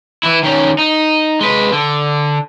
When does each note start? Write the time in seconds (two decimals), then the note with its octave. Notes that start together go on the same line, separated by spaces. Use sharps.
0.23 E3 E4
0.43 D#3 C#4
0.78 D#4
1.41 G#3 B4
1.73 D3